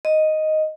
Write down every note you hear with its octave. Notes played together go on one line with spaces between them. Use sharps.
D#5